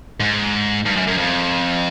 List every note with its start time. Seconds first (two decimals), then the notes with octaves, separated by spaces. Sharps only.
0.20 G#2
0.86 G2
0.96 F#2
1.07 F#2
1.17 F2